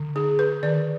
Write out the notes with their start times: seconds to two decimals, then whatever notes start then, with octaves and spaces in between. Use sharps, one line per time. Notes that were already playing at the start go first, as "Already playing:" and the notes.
Already playing: D3
0.16 D#4 G#4
0.39 B4
0.63 D#3 D5